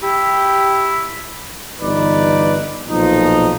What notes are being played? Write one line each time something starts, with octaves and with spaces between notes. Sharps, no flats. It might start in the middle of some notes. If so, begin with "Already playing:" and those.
E4 G4
G1 E3 D#4 B4 D5
B1 A#2 F3 D#4